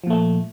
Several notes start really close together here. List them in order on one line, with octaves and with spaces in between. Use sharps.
F3 A#2 A3